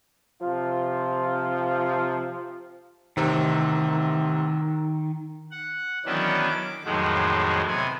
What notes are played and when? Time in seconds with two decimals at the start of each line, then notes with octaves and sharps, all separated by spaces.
0.42 C3 F3 F4
3.17 A1 C3 D#3 C4
5.51 F#5
6.05 D#3 E3 F#3 B3 C#4 D4
6.49 D6
6.85 F2 A2 D#3 F3 F#3 G#3
7.68 C3 B3 G#5